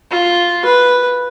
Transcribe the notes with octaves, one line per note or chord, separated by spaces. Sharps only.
F4
B4